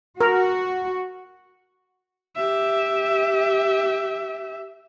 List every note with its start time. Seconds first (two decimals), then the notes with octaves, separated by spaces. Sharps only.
0.21 F#4 A#4
2.36 G4 E5